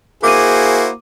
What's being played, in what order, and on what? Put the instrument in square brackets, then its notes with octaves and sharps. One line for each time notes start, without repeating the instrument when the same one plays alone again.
[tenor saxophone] A#3 [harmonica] E4 F#4 C5 [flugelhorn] G#4 [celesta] D6 D#7